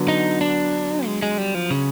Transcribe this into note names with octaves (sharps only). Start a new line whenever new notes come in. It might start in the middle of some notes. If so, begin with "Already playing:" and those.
Already playing: D3 F#3 B3
D#4
D4
G#3
G#3
G3
F3
C#3